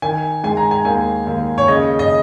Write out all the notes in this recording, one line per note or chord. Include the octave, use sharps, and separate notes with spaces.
D#3 G#5
G#3 G#5
A#5
G#5
D#2 G#5
D#2
C#5
C#3 D#5
D#5